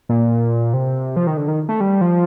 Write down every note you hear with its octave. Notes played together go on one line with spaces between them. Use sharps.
A#2
C3
F3
D#3
D3
D#3
A3
G3
F3